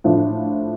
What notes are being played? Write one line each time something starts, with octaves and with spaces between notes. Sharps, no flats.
A2 F3 A3 D4